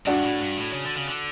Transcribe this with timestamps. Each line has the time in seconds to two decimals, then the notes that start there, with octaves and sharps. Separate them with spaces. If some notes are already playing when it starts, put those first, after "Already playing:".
0.06 G2 D4 F#4
0.23 A2
0.41 G2
0.58 A2
0.73 C#3
0.84 D3
0.96 C#3
1.07 D3